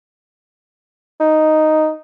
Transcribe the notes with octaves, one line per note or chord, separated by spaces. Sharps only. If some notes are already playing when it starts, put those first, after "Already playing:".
D#4